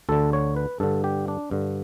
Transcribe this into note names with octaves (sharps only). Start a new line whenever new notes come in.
D2 D3 A4
C#5
B4
G2 D3 A4
G4
D4
G2 D3